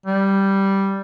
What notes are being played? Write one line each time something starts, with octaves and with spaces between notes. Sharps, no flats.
G3